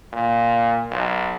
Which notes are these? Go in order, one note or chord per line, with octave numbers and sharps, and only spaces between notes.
A#2
B1